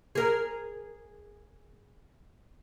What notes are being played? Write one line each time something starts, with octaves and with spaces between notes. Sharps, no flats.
G#4 A#4